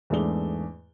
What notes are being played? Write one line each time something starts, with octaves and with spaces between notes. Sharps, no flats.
E2 G#2 A3 D4 G#4 G7